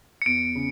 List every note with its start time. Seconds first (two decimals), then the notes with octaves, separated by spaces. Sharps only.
0.22 C#7
0.26 E2 D7
0.55 C#3